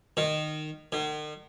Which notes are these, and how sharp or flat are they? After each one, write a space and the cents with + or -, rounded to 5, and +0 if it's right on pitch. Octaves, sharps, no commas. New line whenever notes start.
D#3 -20
D#3 -45